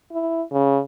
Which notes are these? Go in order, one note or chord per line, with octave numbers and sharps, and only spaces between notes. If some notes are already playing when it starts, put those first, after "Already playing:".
E4
C#3